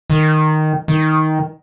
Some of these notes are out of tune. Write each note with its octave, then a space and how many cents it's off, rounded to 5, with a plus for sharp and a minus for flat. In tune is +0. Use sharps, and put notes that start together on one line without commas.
D#3 -5
D#3 +10